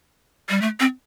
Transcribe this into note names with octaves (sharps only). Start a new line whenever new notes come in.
G3
A3
C4